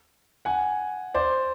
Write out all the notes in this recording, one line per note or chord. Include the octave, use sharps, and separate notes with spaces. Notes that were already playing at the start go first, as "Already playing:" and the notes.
F#5 G#5
C5 D5